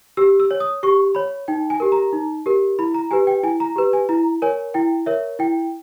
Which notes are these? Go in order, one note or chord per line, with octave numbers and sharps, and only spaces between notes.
G4 E6
E6
C#5
D#6
G4 C#6
C#5 B5
D#4 G5
G#5
G4 A#4
A#5
D#4
G4 A#4
E4 B5
A#5
G4 B4 G#5
G5
E4 G#5
A#5
G4 B4
G#5
E4 A#5
A#4 C#5 G#5
E4 G5
A#4 C#5 E5
E4 G5